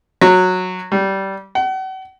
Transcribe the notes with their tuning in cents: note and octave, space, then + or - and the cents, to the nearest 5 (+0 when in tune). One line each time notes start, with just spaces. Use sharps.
F#3 -10
G3 -20
F#5 +40